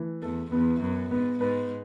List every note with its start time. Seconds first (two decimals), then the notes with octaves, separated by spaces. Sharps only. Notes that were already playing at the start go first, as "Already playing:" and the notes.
Already playing: E3 A3
0.22 E2 A4
0.52 E2 B3
0.81 F#2 B3
1.10 G#2 B3
1.39 G#2 B4